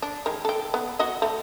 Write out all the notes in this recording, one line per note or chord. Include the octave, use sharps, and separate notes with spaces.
D4
D#3 G#3
A4 G5
B3
F#4 D#5
A3